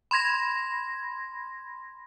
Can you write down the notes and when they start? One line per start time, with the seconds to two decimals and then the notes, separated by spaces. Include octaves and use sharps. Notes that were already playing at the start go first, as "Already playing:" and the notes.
0.11 B5 C6 G#6 A#6